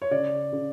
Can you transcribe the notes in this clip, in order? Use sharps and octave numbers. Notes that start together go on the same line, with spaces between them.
C#5
C#3 D5
C#3